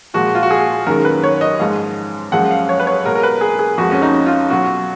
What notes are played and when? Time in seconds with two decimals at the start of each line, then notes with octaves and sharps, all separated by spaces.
0.14 A#2 F3 G#3 F#4
0.35 F4
0.43 F#4
0.51 G#4
0.86 F#2 D#3 G#3 A#4
1.05 B4
1.24 C#5
1.41 D#5
1.60 G#2 F3 G#3 F5
2.32 F#2 F3 G#3 F#5
2.51 F5
2.69 C#5
2.80 B4
2.87 C#5
3.05 B2 G#3 A#4
3.15 A#4
3.23 B4
3.41 G#4
3.59 G#4
3.78 F2 F3 G#3 F#4
3.92 C#4
4.02 D#4
4.26 F4
4.50 B2 F#3 F#4